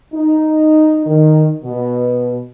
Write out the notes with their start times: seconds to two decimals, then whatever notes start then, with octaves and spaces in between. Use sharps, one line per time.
0.14 D#4
1.06 D#3
1.64 B2